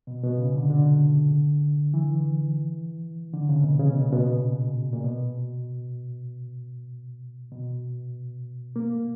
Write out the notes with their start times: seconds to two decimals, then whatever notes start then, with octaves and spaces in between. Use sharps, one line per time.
0.07 B2
0.23 B2
0.38 C#3
0.54 D3
0.70 D3
1.94 E3
3.34 D3
3.49 C#3
3.64 B2
3.79 C#3
3.91 B2
4.02 A#2
4.13 B2
4.93 A#2
5.04 B2
7.52 B2
8.76 A#3